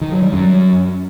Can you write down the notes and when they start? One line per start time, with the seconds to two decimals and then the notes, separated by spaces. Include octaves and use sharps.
0.01 D#3
0.12 F#3
0.22 G3
0.33 F#2